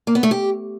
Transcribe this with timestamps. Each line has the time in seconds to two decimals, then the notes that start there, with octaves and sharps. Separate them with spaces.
0.07 A#3
0.15 B3
0.23 A3
0.31 G4